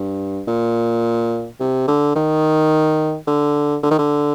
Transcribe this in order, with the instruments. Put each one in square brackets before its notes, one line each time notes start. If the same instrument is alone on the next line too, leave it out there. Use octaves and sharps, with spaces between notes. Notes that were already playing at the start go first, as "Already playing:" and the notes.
Already playing: [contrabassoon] G2
A#2
C3
D3
D#3
D3
D3
D#3
D3